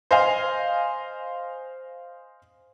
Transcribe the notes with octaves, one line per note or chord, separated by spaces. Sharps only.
C5 D#5 F5 G#5